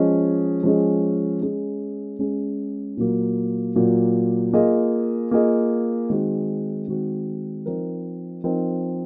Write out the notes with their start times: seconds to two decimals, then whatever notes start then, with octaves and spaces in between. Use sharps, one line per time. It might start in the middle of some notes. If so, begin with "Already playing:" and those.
Already playing: F3 G#3 C#4 G#4 D#5
0.63 F3 G#3 C#4 G#4 D#5
1.42 G#3 C#4 G#4
2.19 G#3 C#4 G#4
2.97 A#2 F#3 A#3
3.76 A#2 F#3 A#3
4.53 A#3 F4 G#4 D#5
5.31 A#3 F4 G#4 D#5
6.10 D#3 G#3 C4 F#4
6.88 D#3 G#3 C4 F#4
7.66 F3 C4 D#4 A#4
8.44 F3 C4 D#4 A#4